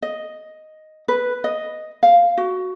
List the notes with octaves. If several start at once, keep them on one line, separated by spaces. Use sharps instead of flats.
D#5
B4
D#5
F5
F#4